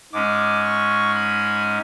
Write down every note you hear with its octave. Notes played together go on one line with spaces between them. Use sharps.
G#2 G#3 C#4 D6
C#6
B5